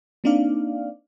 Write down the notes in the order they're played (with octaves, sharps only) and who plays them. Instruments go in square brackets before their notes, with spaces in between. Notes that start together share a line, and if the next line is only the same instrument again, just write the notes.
[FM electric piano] A#3 C4 D4 D#4 D5 F5